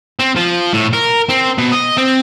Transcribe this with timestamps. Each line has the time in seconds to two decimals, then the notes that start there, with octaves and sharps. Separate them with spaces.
0.19 C4
0.36 F3
0.73 A2
0.93 A#4
1.29 C4
1.58 B2
1.72 D#5
1.97 C4